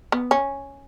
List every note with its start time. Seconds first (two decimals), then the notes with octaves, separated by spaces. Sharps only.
0.12 B3
0.31 C#4